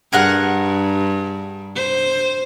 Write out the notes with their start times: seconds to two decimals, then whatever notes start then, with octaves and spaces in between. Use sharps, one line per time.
0.13 G2 G#4 A#4 F#5
1.76 C5